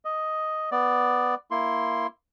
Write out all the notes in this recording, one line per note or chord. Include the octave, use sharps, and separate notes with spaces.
D#5
B3 D5
A#3 E4 C6